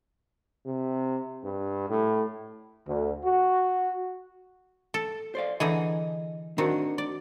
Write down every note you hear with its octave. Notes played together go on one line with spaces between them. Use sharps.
C3
G2
A2
D2
F#4
A4
C5 D5 F5
D3 E3 G#4 D#5 A#5
D#3 C4 D4 F#4
D5